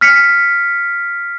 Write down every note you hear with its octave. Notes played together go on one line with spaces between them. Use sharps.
F6 B6 C#7